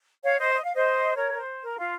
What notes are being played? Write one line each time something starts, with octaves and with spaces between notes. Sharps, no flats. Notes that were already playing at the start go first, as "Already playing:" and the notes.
C#5 F5
C5 D#5
D#5
F5
C5 D#5
A#4 C#5
A#4
C5
A#4
F4